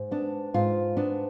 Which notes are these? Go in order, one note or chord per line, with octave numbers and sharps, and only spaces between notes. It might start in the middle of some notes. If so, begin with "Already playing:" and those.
Already playing: G#2
B3 D4
G#2 F4
B3 D4